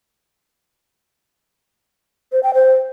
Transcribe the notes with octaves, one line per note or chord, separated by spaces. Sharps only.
C5
G5
C5